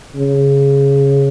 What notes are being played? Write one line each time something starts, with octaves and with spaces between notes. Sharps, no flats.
C#3